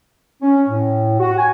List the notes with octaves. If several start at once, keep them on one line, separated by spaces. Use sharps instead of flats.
C#4
A2
F#4
G#5